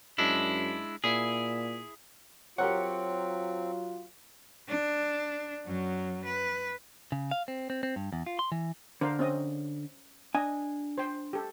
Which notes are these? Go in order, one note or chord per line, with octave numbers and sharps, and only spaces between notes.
F#2 G#3 D4 E4
A#2 E4 G#4
F#3 C4 F4 G4 A#4 C#5 F#5
D4
F#2 F#3
B4
C#3
F5
C4
C4
C4
G2
E2
F4
C6
E3
D3 A#4 C5 F5
C4 C#4 D#5
D4 D#5 G#5
C5 G5
G4 A4